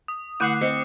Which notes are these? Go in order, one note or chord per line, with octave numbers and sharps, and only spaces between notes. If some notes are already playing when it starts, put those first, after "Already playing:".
D#6
D3 A3 E4 F#5 D6 F#6 C7
C4 D#5 C#7